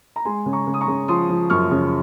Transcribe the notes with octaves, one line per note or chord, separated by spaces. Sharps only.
A#5
G#3 G#5 C6
C#3
A#5 C#6
C#3
D#6
A#5 C#6
C#3
F3 C6 D#6
F3
F#2 C#6 F6
C#3